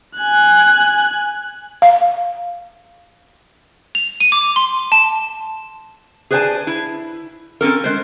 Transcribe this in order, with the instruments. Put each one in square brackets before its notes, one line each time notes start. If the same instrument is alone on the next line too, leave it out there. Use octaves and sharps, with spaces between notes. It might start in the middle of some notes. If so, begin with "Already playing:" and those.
[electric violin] G#5 F#6
[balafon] F5
[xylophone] F7
D#7
D6
C6
A5
[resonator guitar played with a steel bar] G#4 B4 C5 D5 G#5 A5
E4
C4 C#4 A4 A#4
G#3 C5